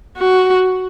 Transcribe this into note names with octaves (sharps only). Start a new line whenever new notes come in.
F#4